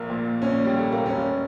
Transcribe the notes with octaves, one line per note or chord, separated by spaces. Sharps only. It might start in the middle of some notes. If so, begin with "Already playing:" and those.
Already playing: A#1 A#3
A#2
A#1 C#4
G3
A#2 A3
A#3
E1 C#4